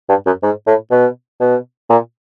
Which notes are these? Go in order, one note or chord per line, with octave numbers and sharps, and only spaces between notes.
G2
F#2
G#2
A2
B2
B2
A#2